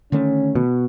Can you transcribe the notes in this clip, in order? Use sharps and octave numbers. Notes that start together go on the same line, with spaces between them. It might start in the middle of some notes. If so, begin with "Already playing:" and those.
D3 D#3 A3 C#4
B2